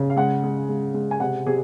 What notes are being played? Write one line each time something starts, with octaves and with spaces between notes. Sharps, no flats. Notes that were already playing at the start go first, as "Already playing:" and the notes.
Already playing: C#3
F5
G#3 F#5
G#3
G#3
G#3
G#5
C3 F#5
C3 G#4